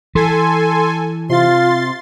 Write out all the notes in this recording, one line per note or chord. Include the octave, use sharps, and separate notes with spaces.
E3 A4 G#5 C6
C3 F4 C6 A6